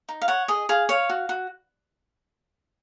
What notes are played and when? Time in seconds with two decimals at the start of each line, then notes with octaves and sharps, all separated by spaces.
0.09 D#4
0.21 F5
0.28 C#5 F#5
0.48 G#4 D#5
0.69 G#4 F5
0.89 C#5 F5
1.10 F#4
1.29 F#4